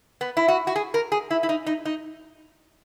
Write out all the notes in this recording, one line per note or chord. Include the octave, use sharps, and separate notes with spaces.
B3
E4
F#4
F#4
G#4
A#4
G#4
E4
E4
D#4
D#4
D#4